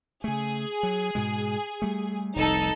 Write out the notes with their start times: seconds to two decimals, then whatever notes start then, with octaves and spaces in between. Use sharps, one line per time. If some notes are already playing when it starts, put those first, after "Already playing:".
0.24 C#3 A3 G#4
0.83 F#3
1.15 G#2 B2 G#3
1.82 G3 A3
2.36 F1 C2 D#4 A4